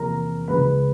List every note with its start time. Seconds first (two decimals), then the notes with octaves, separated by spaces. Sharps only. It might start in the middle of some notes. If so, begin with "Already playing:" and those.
Already playing: E2 C3 F3 A#3 A#4 A#5
0.48 C#2 C#3 F3 G#3 B4 B5